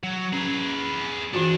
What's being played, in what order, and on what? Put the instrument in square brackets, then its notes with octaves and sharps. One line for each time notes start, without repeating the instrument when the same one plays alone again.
[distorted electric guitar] F#3
[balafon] C#4 [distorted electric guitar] G#4 B4
[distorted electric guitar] G2 D4 [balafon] E3 F4 F#4